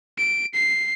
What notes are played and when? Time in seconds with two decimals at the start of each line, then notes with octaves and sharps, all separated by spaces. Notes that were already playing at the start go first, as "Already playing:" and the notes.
0.18 D7
0.54 C7